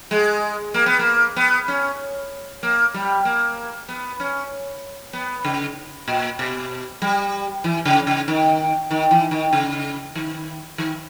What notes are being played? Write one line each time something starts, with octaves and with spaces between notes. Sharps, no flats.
G#3
A#3
B3
A#3
B3
C#4
A#3
G3
A#3
B3
C#4
B3
C#3
A#2
B2
G3
E3
C#3
C#3
D#3
D#3
E3
D#3
C#3
D#3
D#3